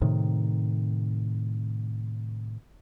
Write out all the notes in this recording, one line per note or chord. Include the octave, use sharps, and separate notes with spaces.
A2 C3 D#3